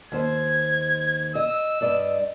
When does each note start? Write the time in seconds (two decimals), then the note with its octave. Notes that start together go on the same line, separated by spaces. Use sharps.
0.12 D#2 C5 G#6
1.35 D#5 E6
1.81 G2 D5 D#5